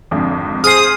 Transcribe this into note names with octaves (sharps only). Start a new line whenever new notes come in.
G#1 F2 D3
G#4 C5 D#6 F6 C7